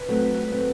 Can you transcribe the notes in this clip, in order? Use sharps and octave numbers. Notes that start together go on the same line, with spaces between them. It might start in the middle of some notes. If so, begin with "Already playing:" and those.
Already playing: B4
F#3 A3 C4
F#3 A3 C4